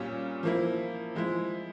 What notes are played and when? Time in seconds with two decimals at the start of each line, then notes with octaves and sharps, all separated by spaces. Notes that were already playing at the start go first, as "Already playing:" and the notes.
Already playing: A#2 G3 C#4 F4
0.43 F3 A#3 E4
1.15 F3 G#3 E4